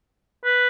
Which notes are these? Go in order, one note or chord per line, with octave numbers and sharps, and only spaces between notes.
B4